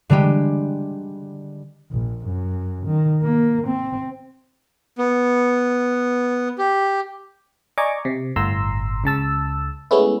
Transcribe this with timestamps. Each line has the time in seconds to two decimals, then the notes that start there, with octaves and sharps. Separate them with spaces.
0.10 D3 G3 G#3 G4
1.91 A#1
2.26 F#2
2.86 D#3
3.22 A#3
3.67 C4
4.98 B3
6.58 G4
7.78 D5 D#5 G#5 A#5 C#6 D6
8.05 C3
8.36 G1 A2 A#5 C6 E6
9.04 C#2 C#3 A5 E6
9.91 G#3 A3 B3 C#4 E4